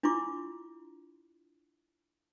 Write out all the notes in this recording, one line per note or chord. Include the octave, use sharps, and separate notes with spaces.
D4 E4 F4 C6 D6